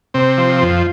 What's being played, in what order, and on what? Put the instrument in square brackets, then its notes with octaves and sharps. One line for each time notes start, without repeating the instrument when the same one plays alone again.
[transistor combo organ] C3 C4
F3
F2